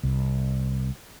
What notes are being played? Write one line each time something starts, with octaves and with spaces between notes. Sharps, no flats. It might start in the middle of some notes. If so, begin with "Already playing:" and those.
C2